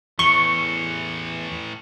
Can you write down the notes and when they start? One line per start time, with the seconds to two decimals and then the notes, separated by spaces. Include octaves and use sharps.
0.19 E2 A2 E3 C#6 C#7 G7